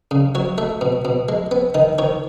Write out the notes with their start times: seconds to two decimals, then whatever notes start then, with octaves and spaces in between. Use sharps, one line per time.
0.11 C#3
0.35 F#3 C#5
0.58 A3 E5
0.81 B2
1.05 B2
1.29 G#3
1.51 B3
1.74 D#3 D#5
1.98 D#3 C#5